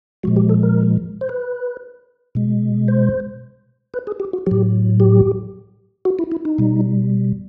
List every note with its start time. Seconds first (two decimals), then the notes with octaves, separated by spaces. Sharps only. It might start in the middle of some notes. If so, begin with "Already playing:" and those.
0.23 A#2 F3 G#3 F#4
0.36 G4
0.49 A4
0.63 A#4
1.21 C5
1.29 B4
2.35 B2 G#3
2.88 C5
3.94 B4
4.07 G#4
4.20 G4
4.33 F#4
4.46 A2 F#3 G4
5.00 G4
6.05 F#4
6.19 E4
6.32 E4
6.45 D#4
6.58 B2 G3